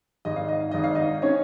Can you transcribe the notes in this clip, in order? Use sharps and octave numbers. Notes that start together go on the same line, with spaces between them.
G#1 G#2 D#3 D#5
F5
D#5
F5
G#1 G#2 D#3 D#5
F5
D#4 D#5
D#3 C#4 C#5